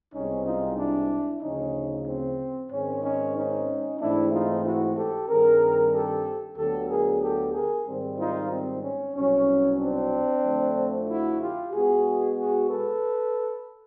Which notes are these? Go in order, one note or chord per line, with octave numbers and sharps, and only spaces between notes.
C2 B2 G#3 C4 C#4 D#4
D#4 F4
D4 E4
D2 C#3 F3 C#4 D#4
C4
G#2 D#3 G#3 C4 C#4
C#4 D#4
C#4 D#4
G#2 E3 A3 C4 D4 E4
D#4 F4
E4 F#4
G4 A4
G2 D#3 G3 C4 G#4 A#4
G4 A4
D2 D3 F#3 B3 G4 A4
G#4 A#4
G4 A4
G#4 A#4
G#2 D#3 G3 C4
D#4 F4
C4
C#4
C2 B2 F#3 C#4
C4 D4
F2 D3 F3 A3
E4 F#4
F4 G4
B2 G#3 B3 F#4 G#4
F#4 G#4
A4 B4